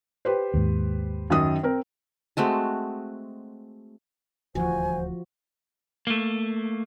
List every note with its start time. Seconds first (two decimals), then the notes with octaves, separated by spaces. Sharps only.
0.25 G4 B4 C5
0.54 D#2 G#2
1.30 F#2 D#3 D#6
1.63 C4 A#4
2.37 G#3 A3 C4 F#4
4.55 D#1 D2 E3 F3 F#4 C5 G#5
6.07 A3 A#3